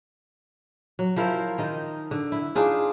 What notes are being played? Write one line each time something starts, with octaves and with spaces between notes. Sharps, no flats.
F#3
F3 E4 A#4 C5
D#3 D#4 D#5
D3
E4
D4 D#4 F4 G#4